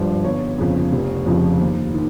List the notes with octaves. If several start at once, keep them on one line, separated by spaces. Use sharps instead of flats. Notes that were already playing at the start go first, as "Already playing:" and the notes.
Already playing: G#1 G2 F3
G1 C#5
F2 C#3
F1
F2 C#3 F3
D#2
D#3